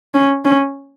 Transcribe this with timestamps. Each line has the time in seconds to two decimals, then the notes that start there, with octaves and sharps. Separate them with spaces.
0.14 C#4
0.45 C#4